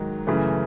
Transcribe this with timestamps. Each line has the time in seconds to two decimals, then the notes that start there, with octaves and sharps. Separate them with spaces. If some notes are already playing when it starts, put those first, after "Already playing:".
Already playing: G#2 D#3 F#3
0.27 F#2 C#3 E3 A3